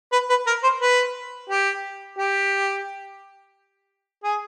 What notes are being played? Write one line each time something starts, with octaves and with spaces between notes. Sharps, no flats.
B4
B4
A#4
C5
B4
G4
G4
G#4